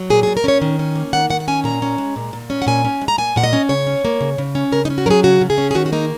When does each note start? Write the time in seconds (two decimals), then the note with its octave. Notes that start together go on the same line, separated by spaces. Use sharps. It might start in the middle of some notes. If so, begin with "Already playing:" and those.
Already playing: F#3
0.10 A#2 G#4
0.23 A#2 G#4
0.37 A#4
0.44 C#4 C#5
0.61 D#3
0.79 C#4
0.96 A#3
1.13 D#3 F#5
1.30 D#3 F#5
1.40 F#5
1.48 C#4 G#5
1.64 A#2 A#5
1.82 C#4
1.98 G#3
2.16 A#2
2.33 A#2
2.50 C#4
2.62 F#5
2.67 A#2 G#5
2.85 C#4
3.01 G#3
3.08 A#5
3.18 A#2 G#5
3.36 A#2 F#5
3.44 D#5
3.53 C#4
3.69 C#3 C#5
3.87 C#4
4.05 A#3
4.21 C#3
4.38 C#3
4.55 C#4
4.72 C#3 A#4
4.85 D#4
4.90 C#4
4.98 F#4
5.06 F#3 G#4 A#4
5.23 C#3 F#4
5.41 C#3
5.50 G#4
5.58 C#4
5.71 G#4
5.75 D#3 F#4
5.86 F#4
5.92 A#3 D#4